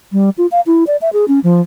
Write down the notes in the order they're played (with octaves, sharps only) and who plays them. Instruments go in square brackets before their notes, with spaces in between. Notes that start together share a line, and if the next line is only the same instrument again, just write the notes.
[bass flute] G3
F4
F5
E4
D5
E5
G#4
C#4
F3